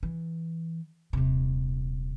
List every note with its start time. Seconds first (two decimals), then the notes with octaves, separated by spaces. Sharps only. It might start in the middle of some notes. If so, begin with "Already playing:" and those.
0.03 E3
1.13 D#1 C3